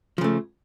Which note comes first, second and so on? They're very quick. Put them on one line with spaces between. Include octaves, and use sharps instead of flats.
F3 C#3 A3